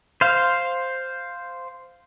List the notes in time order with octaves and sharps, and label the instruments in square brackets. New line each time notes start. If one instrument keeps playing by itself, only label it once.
[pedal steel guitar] C5 F5